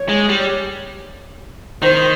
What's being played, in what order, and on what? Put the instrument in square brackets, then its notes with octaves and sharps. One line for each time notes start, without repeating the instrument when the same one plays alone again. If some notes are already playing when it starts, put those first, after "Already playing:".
Already playing: [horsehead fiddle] C#5
[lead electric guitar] G#3
G3
[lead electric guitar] D#3 [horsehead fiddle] C5